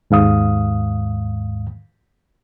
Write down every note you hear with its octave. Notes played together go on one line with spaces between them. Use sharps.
D#2 G#2 F5 D#6